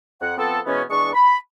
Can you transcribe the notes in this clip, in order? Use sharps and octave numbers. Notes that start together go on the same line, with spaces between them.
F2 F#5
F3 B3 C4 A4
B2 E3 G#3 B3 C#4
E2 G#3 D4 C#6
B5